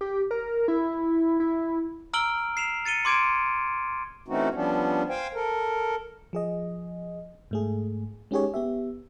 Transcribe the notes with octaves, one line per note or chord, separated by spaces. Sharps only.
G4
A#4
E4
E4
A#5 E6 F6 D7 F#7 G7
C7 E7 F7
A6 C#7 D#7 G7
C6 D6 G#6 D7 E7
E3 A3 C4 C#4 D#4 F#4
F3 G3 B3 C#4 D4
C5 F5 G5 G#5
A4 A#4
F3 G#4 D#5
G#2 A3 G#4
G#3 C#4 D#4 G4 G#4 C#5
B3 G4 E5